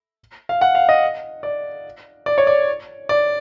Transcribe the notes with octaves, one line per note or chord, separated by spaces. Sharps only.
F5
F#5
F5
D#5
D5
D5
C#5
D5
D5